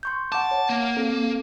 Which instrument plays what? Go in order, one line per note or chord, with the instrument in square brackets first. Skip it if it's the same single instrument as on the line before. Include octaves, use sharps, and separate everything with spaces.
[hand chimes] C6 C#6 G6
[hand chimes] F#5 D6 [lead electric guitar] A5
[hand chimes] C#5 F#5
[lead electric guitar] A#3
[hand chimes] C4 A4